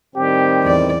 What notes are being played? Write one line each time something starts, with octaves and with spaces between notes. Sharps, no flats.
A2 D#3 G3 C4 G4
E2 D5